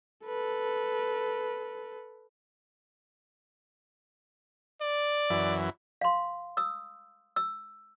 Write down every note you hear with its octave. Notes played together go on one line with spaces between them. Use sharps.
A4 B4
D5
F#2 E3
F5 C6
D#6 E6
E6